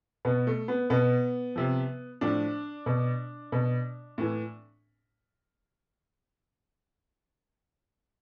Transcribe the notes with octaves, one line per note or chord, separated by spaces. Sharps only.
B2 B3
A3
B3
B2 B3
C3 F3
A2 F3 D4
B2
B2
A2 E3